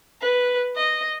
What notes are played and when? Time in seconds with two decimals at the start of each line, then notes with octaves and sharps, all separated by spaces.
0.21 B4
0.76 D#5